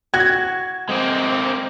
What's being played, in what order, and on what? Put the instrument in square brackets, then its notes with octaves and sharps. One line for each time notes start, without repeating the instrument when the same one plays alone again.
[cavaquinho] F#4 [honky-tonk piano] G#6
[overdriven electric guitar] G#3 A#3 [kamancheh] C4